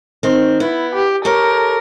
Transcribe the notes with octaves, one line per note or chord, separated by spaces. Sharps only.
D#3 C4
B3 E4
G4
G4 A4 A#4 C#5